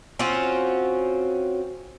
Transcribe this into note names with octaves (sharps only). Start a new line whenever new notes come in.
C4 C#4 F4 F#4